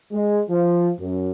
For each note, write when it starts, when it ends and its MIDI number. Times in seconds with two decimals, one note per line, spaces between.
0.12 0.40 56
0.49 0.90 53
0.99 1.30 42